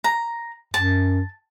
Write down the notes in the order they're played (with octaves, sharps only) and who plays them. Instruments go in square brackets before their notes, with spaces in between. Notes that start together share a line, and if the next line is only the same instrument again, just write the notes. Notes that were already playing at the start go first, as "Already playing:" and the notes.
[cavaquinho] A#5
[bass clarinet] F#2 [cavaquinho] A5